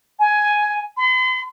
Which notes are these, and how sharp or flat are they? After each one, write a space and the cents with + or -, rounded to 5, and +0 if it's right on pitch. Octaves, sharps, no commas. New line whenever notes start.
G#5 +10
C6 -45